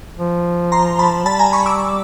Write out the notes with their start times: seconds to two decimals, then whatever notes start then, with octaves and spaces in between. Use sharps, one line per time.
0.18 F3
0.72 A#5 C6
0.99 A5 B5
1.26 G3 A5 B5
1.39 G#5 A#5
1.53 B5 C#6
1.66 D6 E6